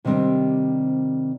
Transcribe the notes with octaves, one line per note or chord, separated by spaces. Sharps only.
C3 D#3 G3 C4 D4